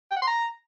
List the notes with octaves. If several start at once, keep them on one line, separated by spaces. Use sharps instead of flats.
G5
F#5
C6
A#5